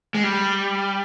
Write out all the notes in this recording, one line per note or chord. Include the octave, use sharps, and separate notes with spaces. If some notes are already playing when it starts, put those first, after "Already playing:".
G#3
G3